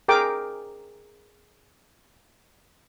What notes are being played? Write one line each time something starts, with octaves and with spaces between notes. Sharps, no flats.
G#4 A#4 G5 D6